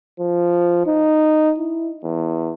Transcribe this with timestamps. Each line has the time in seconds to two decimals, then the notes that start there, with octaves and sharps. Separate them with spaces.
0.20 F3
0.87 D#4
1.58 E4
2.04 E2